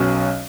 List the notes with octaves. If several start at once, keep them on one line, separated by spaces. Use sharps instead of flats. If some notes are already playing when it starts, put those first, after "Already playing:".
Already playing: B1 B2 F#3 C#4